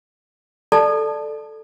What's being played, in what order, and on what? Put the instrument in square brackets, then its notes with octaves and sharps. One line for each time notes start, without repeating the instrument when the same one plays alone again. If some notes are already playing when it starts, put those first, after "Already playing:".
[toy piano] A4 D5 A5